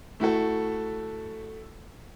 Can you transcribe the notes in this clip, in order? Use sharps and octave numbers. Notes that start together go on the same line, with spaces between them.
A3 E4 F#4 A4